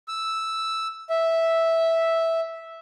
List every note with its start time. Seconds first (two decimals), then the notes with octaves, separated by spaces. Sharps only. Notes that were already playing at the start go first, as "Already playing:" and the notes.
0.08 E6
1.10 E5